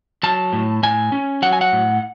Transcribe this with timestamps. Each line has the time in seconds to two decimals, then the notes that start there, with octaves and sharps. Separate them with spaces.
0.23 F#3 A5
0.53 A2
0.83 A2 G#5
1.12 C#4
1.42 F#3 F#5
1.53 G#5
1.61 F#5
1.72 A2